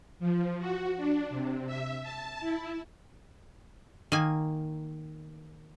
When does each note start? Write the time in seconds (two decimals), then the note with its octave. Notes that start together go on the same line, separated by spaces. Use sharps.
0.20 F3
0.59 F#4
0.97 D4
1.30 C3
1.66 E5
2.03 A5
2.40 E4
4.12 D#3 A#3 G#5